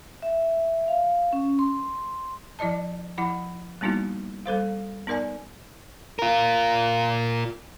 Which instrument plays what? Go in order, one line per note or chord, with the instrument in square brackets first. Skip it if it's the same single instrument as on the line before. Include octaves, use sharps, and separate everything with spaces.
[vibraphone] E5
F5
C#4
C6
[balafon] F3 E4 D5 D#5 A5
F3 E4 F#5 B5
G3 A#3 B3 D#4 E4 F#4
G3 A4 C5 F5
B3 D#4 A#4 D5 G#5
[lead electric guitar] F4 A#4